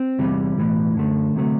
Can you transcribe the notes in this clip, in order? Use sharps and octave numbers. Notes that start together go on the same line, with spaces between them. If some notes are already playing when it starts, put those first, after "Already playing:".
Already playing: C4
E2 C3 E3 G3
B1 A2 E3
F#2 D3 A3
D2 C3 F#3 A3